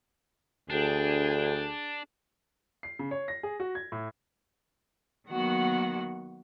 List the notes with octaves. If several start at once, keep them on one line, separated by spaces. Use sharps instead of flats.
D2 D4 G#4 G5
C7
C#3
C#5
A#6
G#4
F#4
G#6
A2
D#3 F#3 A#3 B3 F#4 F#5